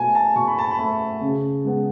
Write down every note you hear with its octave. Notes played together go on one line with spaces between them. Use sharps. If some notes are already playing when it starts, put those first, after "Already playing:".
Already playing: B2 A3 G#5 A5
A5
B2 C#6
B5
A5
B5
A3
C#3
G#3 B3